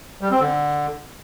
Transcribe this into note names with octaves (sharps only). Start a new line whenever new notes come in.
G3
C4
D3